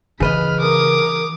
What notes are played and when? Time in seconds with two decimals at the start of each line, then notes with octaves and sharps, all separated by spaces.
0.20 C#3 E3 B4 D#5 B5 F6
0.60 A#4 D6 D#6